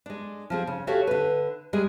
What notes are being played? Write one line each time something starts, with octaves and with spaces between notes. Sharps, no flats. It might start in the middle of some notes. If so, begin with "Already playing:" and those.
G#3 D4
F3 C4 G#4
C#3
F#4 G4 A4 C#5 E5 F5
D3 B4
G3 G#3 G#4